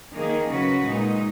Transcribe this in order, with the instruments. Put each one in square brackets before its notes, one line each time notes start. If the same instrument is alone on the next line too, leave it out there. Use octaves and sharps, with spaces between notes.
[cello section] D#3 A#3 D#4 G#4
C#3 F#3 C#4 F#4 B4
A#2 G#3 D#4